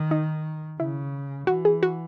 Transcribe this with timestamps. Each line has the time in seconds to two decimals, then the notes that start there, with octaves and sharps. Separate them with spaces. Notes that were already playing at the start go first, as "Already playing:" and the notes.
Already playing: D#3
0.11 D#4
0.80 C#3 E4
1.47 E3 F#4
1.65 G#4
1.83 F#4